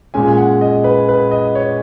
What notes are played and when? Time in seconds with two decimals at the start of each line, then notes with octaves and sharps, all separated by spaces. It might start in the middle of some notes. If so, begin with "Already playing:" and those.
0.14 A#2 G#3 C#4 G#5
0.37 F#5
0.61 D#5
0.84 B4
1.09 B4
1.31 D#5
1.55 C#5